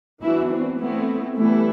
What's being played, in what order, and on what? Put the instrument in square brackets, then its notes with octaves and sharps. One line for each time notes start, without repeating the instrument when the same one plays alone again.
[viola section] E3 B3 D4 F#4 [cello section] E4
[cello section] C4
[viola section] A3 C4 E4 [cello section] B3
[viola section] E3 G3 B3 E4 A4 [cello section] A3